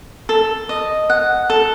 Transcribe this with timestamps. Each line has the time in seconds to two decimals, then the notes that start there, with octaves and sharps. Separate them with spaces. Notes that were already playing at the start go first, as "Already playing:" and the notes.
0.29 A4
0.69 D#5
1.10 F#5
1.50 A4